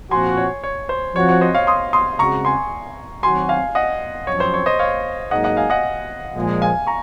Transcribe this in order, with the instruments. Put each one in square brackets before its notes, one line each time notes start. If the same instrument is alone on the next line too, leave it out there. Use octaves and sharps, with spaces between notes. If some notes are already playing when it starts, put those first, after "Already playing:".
[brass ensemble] A#2 F3 C4 F#4 [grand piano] G#5 C6
[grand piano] C#5
C#5
C5
[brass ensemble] F3 C4 F#4 [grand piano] C#5
[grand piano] C#5
C5 D#5
C#5 F5
C6 D#6
C6 D#6
[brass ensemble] C#3 G#3 C4 F#4 [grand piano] A#5 C#6
[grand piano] G#5 C6
[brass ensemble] D#3 F#3 C4 F#4 [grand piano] G#5 C6
[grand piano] F5 G#5
D#5 F#5
[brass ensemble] F#2 F3 C4 [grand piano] C#5
[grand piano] C5
C#5
C5 D#5
C#5 F5
[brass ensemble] G#2 F#3 A#3 D#4 G#4 [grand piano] D#5 F#5
[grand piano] D#5 F#5
F5 G#5
D#5 F#5
[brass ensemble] A#2 F3 G#3
[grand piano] F5 G#5
A#5 C#6